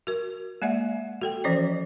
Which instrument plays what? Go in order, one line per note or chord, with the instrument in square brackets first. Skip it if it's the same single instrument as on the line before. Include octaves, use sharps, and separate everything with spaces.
[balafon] F#4 A#4
G#3 A#3 D5 E5 F#5
F#4 A4 G5
E3 F3 C#4 C5 D5 D#5